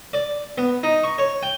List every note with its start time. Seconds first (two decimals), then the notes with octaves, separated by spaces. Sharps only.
0.13 D5
0.58 B3
0.83 D#4
1.04 C#6
1.18 C#5
1.43 G5